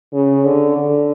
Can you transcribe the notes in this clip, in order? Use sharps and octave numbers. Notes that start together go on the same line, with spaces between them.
C#3
D3
D3